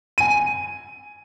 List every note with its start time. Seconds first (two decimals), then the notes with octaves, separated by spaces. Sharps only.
0.18 G#5 D#7